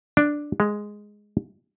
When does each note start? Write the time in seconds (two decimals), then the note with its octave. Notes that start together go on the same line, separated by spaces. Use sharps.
0.17 D4
0.60 G#3